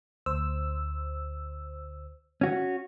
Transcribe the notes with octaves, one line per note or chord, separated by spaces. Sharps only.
D2 C5 E6
C#4 F#4